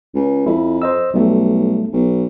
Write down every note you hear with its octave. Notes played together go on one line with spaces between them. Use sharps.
C#2
F2 E4
C5 D#5 E6
B1 G3 A3
B1